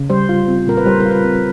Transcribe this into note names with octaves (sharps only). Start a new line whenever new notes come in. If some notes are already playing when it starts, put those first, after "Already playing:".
Already playing: C#3
G3 C5
F4
C4
A#2 A#4
B4
G3 C5
A#4
F4
B4
C4